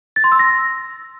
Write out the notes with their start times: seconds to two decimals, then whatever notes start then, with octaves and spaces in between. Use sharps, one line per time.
0.16 A6
0.24 C6
0.32 E6
0.39 A#6